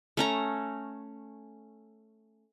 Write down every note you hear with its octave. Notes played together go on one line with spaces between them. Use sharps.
A3 C#4 A#5